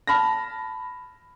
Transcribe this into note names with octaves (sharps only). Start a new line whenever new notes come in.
A5 B5 F6 A#6